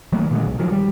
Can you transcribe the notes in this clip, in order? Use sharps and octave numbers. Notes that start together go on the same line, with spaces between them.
D#3 F#3 A3 A#3
A#2 D3 G#3
B1
D#3 F3 F#3
G3